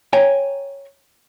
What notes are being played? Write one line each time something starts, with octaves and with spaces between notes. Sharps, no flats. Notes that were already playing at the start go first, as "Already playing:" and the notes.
C#5 G5 G#5 A#5